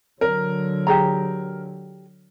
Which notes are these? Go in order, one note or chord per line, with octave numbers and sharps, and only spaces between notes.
D3 F#3 A#4
G4 G#4 A#5